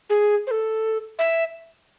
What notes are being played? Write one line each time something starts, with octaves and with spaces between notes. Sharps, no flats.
G#4
C5
A4
E5